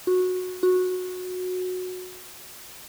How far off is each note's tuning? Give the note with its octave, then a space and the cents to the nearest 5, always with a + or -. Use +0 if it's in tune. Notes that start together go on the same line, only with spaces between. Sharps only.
F#4 -15
F#4 -15